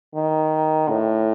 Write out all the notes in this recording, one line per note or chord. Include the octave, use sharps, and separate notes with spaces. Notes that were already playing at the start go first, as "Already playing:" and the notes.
D#3
A2